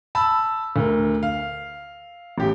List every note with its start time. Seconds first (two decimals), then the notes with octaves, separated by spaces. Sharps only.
0.15 A5 B5 E6
0.76 D2 A#4
1.23 F5
2.38 A1 G4